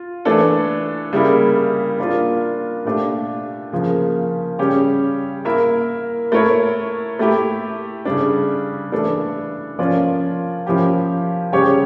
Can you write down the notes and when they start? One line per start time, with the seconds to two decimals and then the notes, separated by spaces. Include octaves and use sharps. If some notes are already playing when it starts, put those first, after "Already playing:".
Already playing: F4
0.25 E3 A3 D4 A4
1.12 C#3 G3 A#3 E4 G4
1.98 A#3 D4 F4
2.85 A#2 A3 D4 G4
3.72 C#3 F3 A#3
4.59 C#3 G3 C#4 G4
5.45 A#3 E4 A#4 E5
6.32 A3 E4 A#4 C#5
7.19 A3 E4 G4
8.05 C#3 G3 D4
8.92 E3 A3 D4 A4
9.79 F3 C#4 F4 A#4 D5
10.66 F3 C#4 E4 G4 A#4
11.52 C#3 G3 C#4 G4 C#5